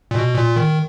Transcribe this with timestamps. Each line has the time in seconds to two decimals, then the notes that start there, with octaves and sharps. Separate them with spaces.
0.11 A#2
0.15 B2
0.35 A#2
0.56 D#3